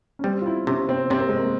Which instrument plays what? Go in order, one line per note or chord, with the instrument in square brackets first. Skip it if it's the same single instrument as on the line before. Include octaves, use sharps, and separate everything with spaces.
[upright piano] C#4
[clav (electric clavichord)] G3 [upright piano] C4
[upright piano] F4
E4
[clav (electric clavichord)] C3 [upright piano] C#4
[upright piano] C4
[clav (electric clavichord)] C3 [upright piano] C4
[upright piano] A#3
G#3
A#3